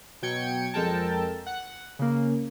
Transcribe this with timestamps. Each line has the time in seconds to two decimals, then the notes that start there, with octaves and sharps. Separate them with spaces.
0.22 B2 F#3 G5 G#6 C#7
0.74 F2 G#3 A4 A#4 G5 A5
1.47 F#5
1.99 C#3 A#3